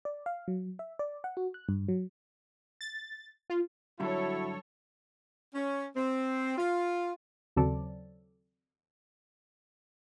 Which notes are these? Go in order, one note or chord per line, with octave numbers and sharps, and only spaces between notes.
D5
F5
F#3
E5
D5
F#5
F#4
F#6
G2
F#3
A6
F4
G2 D3 F#3 E4 F#4 A4 C#5
C#4
C4
F4
D#2 C#3 F#3 C4 A4 D5